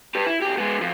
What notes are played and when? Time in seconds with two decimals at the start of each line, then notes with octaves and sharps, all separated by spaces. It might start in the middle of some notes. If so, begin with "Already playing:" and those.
0.15 G4 B4
0.26 E4
0.42 B1 G4
0.57 G#3 B3
0.78 F#2 F3